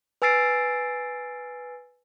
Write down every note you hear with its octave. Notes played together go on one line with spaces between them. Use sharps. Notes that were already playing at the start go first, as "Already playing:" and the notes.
B4 G#5 E6 A6 C7 D7